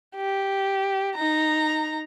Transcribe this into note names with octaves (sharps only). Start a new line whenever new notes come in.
G4
D#4 A#5